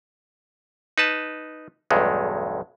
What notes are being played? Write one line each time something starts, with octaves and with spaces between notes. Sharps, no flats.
D#4 B4 A5
B1 E2 G2 G#3 A3